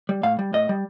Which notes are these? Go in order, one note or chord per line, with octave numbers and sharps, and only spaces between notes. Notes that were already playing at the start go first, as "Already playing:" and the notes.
G3
A2 F5
G3
A2 D#5
G3